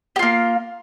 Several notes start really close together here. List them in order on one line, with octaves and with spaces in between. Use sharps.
G4 F4 A#3